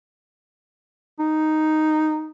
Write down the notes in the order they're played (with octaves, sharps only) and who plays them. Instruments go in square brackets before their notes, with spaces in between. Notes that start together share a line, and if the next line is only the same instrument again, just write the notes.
[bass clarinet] D#4